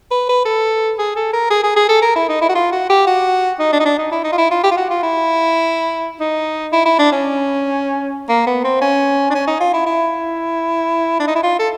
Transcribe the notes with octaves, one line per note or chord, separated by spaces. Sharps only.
B4
B4
A4
G#4
A4
A#4
G#4
G#4
G#4
A4
A#4
E4
D#4
E4
F#4
F4
F#4
G4
F#4
D#4
D4
D#4
D4
D#4
E4
D#4
F4
E4
F4
G4
F4
F#4
F4
E4
D#4
E4
E4
D4
C#4
A#3
B3
C4
C#4
D4
C#4
D#4
F4
E4
E4
D4
D#4
E4
F4
A4